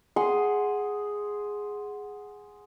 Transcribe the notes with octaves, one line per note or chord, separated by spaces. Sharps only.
G#4 F#5 C6